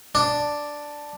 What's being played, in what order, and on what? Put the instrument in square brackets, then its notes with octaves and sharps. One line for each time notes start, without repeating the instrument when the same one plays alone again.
[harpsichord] D4